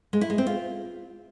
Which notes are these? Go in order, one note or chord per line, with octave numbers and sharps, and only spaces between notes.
G#3
E4
G#3
C4
F4